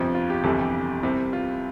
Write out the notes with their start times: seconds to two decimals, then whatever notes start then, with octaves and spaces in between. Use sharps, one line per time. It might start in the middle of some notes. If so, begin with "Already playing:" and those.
Already playing: G1 F2 C3 F3 C4
0.15 F4
0.30 G4
0.44 G1 F2 C3 E3 G3 A4
0.59 G4
1.03 C2 C3 G3 C4
1.33 F4